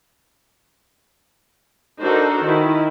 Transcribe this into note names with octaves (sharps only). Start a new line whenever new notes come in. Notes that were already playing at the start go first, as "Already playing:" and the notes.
D4 D#4 F#4 A4 A#4 C5
D#3 E4